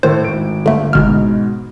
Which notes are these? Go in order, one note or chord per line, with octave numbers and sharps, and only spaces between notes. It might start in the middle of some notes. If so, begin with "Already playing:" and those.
A2 D#3 A3 C5
G#1 D7
G1 D3 A3
G1 G#2 B2 F6